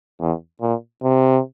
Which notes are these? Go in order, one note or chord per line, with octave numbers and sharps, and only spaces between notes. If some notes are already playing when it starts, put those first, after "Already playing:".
E2
A#2
C3